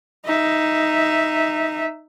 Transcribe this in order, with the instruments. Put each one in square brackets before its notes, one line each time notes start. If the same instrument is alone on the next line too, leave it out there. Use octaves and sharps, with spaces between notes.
[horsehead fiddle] D#4 E5